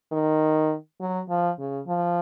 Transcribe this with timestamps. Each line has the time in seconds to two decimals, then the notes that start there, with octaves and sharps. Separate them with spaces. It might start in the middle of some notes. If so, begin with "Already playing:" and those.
0.12 D#3
1.00 F#3
1.30 F3
1.59 C#3
1.88 F3